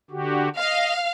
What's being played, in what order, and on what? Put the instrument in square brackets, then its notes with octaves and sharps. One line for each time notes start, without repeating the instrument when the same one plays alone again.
[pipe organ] D3 F#4 G4
[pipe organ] D#5 [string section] F5